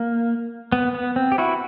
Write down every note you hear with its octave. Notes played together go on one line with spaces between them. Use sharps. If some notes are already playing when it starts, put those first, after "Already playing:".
Already playing: A#3
B3
B3
C4
G4
E4 F#4